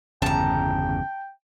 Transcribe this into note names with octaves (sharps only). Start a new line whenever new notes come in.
G1 E2 C#3 G5 A5 A#5